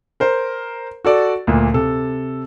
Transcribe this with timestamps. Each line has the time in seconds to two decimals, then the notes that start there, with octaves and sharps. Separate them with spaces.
0.20 A#4 C5
1.05 F#4 A4 D5
1.47 D2 A#2
1.74 C3 A4